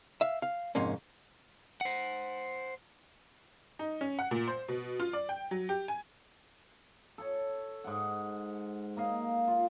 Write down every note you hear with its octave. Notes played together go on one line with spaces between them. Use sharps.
E5 F5
F5
F2 G#2 C3 A#3 C#4
C5 F#5
D#4
C#4
F#5
A#2
C5
B2
F4
D5
G5
F#3
G4
G#5
A4 C#5
G#2 F#5
A#3 D#5 F5
F4 F5